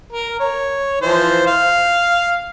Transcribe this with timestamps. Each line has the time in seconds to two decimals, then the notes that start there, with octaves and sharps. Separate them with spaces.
0.13 A#4
0.39 C#5
1.01 E3 F3 C5
1.47 F5